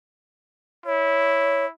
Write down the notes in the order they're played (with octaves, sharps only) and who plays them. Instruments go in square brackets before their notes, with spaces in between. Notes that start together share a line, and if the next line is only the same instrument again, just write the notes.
[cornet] E4 [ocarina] C#5